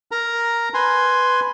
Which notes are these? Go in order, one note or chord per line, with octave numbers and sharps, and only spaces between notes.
A#4 A#5
B4 G#5 C6